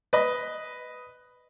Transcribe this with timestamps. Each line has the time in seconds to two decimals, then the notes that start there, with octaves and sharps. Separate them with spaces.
0.13 B4 D#5